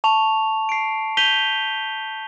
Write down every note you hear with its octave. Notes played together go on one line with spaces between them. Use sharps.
A5 C#6 F7
C7 D7
G6 B6 D#7 F7 G7